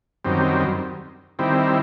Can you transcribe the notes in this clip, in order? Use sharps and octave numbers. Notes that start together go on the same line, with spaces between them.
F#2 D#3 G3 C4
D#3 G3 C4 E4